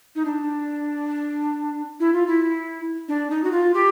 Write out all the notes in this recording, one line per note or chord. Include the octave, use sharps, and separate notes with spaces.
D#4
D4
E4
F4
E4
D4
D#4
F#4
F4
G4